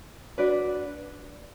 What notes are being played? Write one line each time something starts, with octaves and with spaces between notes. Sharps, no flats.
D4 F#4 B4 D5